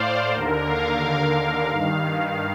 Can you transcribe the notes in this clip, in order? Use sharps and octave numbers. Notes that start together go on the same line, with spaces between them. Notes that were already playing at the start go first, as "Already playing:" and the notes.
Already playing: A2 C5 D5 F5
D#2 D3 A#4
F5
G2 D#3